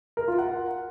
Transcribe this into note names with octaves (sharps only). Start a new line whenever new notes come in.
A#4
F4
F#5